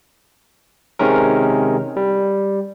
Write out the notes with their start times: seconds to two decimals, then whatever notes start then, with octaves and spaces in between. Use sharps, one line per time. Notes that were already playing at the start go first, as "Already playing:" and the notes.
0.99 C3 D#3 G#3 C#4 A#4
1.97 G3